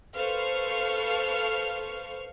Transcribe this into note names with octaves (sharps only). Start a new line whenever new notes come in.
A4 B4 C5 F5 C#6 F6